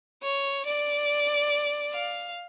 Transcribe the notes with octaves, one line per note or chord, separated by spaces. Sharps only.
C#5
D5
F5